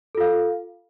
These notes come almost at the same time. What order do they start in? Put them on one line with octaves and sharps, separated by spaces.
A4 F4 F5